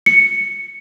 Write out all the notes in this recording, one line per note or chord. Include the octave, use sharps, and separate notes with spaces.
C#7